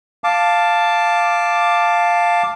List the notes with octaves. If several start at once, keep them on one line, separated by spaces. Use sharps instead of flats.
F5 A5 D6